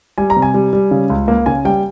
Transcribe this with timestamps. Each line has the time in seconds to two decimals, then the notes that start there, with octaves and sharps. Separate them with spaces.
0.18 G3 G#5
0.30 A#5
0.36 C3
0.42 G#5
0.54 G3
0.73 G3
0.91 C#3
1.10 C#2
1.28 A#3
1.46 C#3 G#5
1.65 G3 G5